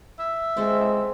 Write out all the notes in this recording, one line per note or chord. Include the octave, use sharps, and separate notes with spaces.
E5
G#3 C4 A4